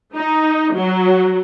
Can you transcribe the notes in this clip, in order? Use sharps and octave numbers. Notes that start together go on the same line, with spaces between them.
D#4
F#3